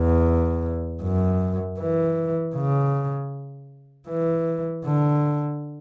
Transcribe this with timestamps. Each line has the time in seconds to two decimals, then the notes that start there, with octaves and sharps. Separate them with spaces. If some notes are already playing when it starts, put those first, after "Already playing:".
Already playing: E2
1.02 F#2
1.79 E3
2.55 C#3
4.09 E3
4.85 D3